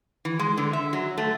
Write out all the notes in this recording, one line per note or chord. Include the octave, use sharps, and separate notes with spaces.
E3
G#3
D3
E5
F#3
A3